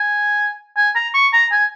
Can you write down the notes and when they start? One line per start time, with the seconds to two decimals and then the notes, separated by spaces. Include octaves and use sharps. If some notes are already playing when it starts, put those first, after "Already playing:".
Already playing: G#5
0.77 G#5
0.96 A#5
1.14 C#6
1.33 A#5
1.52 G#5